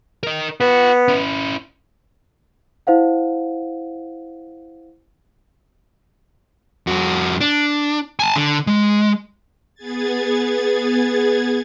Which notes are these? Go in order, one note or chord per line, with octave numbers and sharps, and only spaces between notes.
A#4 D#5
B3 F4 F#5
C#4 E4
E4 C5 F5 F#5
F2 F#4
D4
G#5 A5
D3
G#3
B3 G#4 G#6 A6